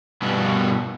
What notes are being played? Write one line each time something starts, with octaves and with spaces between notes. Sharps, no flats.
G2 B2 B3